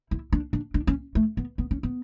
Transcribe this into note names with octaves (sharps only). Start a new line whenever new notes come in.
E4
D4
D4
D4
C#4
A3
B3
B3
C#4
B3